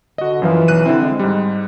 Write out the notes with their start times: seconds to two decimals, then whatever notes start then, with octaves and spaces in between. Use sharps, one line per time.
0.18 D3 F#4 D#5
0.42 F#2 E3 F3 F5
0.68 B1 F#6 D#7
0.86 D3 C4 E4
1.01 G#3
1.19 G#2 G3